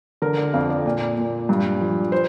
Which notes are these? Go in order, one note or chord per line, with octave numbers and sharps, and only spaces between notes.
D3 A#4
D5
F2 F5
D5
A#2
A#2
G2
F3
C5